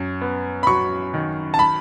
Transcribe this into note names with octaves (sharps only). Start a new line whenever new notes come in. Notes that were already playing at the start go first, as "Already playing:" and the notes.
Already playing: F#2
B3
B5
F#3 C#6
D#3
A5
B5